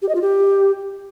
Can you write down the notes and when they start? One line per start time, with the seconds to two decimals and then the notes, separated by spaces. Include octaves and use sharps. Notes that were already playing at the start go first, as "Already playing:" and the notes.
0.02 G4
0.09 D#5
0.15 F4
0.22 G4